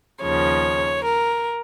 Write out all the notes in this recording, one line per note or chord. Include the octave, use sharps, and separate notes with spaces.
D#2 C#3 F3 C#5
A#4